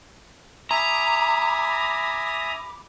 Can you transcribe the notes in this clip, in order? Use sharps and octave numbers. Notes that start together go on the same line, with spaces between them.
E5 G#5 A#5 B5 D6 D#6